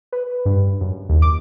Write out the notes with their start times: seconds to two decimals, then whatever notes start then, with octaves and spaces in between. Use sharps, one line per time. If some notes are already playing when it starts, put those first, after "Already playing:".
0.12 B4
0.45 G2
0.81 F#2
1.09 D#2
1.22 D6